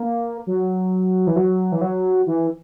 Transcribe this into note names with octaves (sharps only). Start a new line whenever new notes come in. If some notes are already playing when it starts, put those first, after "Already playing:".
Already playing: A#3
F#3
E3
F#3
E3
F#3
E3